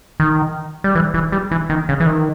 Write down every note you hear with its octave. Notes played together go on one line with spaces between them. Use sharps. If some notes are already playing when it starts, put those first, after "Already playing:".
D#3
G3
E3
E3
G3
E3
D#3
C#3
E3
D#3